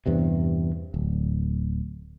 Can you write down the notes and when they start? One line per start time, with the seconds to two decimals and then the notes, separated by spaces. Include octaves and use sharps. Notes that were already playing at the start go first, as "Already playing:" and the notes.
0.06 E2 G2 C3
0.94 D1